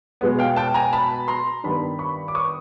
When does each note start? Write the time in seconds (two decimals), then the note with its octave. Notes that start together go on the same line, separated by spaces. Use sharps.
0.21 B2 G#3 B3
0.39 F5 G5
0.56 G5 A5
0.74 G#5 A#5
0.93 A5 B5
1.28 A#5 C6
1.63 G2 D#3 G3 B3 A5 B5
1.99 B5 C#6
2.28 D6
2.35 C#6 D#6